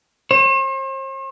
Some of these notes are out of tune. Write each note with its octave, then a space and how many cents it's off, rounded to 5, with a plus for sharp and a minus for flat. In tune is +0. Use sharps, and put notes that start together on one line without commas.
C5 +45